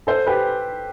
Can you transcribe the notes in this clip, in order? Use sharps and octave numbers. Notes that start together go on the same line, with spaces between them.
A4 C5
G4 B4